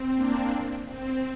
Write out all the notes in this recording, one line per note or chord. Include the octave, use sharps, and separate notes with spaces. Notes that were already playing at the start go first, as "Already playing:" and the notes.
Already playing: C4
A#3 D4
C4